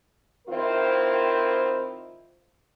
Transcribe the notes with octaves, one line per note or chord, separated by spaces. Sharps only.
D#3 C4 E4 F4 A#4 C5